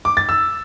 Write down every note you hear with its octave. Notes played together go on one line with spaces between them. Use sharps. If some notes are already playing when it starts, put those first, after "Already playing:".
D6
A6
E6